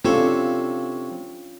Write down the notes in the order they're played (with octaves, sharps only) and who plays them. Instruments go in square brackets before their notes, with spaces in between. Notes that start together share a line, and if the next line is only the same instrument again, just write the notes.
[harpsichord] C3 A4 C#5 [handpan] C#4 D4 F4